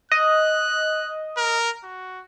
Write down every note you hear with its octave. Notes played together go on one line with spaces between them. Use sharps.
D#5 F#6
A#4
F#4